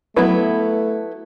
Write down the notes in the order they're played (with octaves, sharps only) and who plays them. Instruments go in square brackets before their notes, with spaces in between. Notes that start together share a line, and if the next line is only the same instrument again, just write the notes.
[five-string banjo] F#3 B3 E4 B4 [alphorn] A3